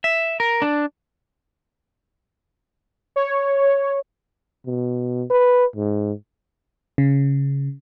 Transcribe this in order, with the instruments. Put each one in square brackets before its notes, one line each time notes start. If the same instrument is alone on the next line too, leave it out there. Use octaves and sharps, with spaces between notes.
[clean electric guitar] E5
A#4
D4
[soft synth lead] C#5
[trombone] B2
B4
G#2
[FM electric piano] C#3